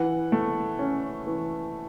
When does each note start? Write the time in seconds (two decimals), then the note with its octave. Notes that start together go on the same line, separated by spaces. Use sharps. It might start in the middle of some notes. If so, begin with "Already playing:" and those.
Already playing: E3 F#5
0.32 A3
0.79 C#4
1.27 E3